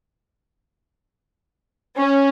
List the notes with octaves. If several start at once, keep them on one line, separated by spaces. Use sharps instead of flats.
C#4